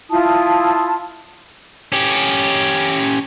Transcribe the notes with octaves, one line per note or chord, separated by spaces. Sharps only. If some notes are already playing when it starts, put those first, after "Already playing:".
E4 F4 A5 D#6
C#4 G4